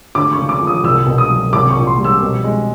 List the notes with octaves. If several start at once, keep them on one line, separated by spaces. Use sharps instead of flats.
D2 D6
C#6
C#3
D6
F3
D#6
C2 E6
B2
D#6
F#3
C2 D6
A#2 C#6
C6
G3
E6
B2
G#3